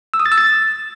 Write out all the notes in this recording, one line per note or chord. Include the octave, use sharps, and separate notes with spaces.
E6
D#6
A6
E6
A6